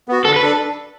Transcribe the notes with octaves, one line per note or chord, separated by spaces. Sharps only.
B3 F#4
D3 A4
B4
D4 A4